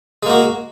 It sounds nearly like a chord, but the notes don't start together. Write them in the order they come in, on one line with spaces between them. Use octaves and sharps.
G#3 A#3 F#4